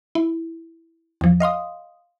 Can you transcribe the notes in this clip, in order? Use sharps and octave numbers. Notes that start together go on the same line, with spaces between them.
E4
E2 F3
D#5 F5 C6 D#6